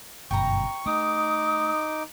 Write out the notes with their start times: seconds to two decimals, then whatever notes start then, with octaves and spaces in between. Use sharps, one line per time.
0.31 G1 F#2 B2 G5 A#5 C#6
0.86 A3 D#4 D6 D#6